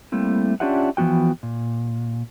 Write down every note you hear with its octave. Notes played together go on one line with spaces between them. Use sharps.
G3 A3 A#3 C4 E4
C#4 D4 F4 G4 E5 F#5
E3 F3 B3 F#4 G5
A#2